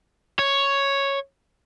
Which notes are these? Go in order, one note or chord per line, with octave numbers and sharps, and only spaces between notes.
C#5